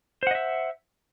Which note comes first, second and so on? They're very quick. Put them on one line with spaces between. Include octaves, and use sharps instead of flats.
C5 F#5 D#5 E5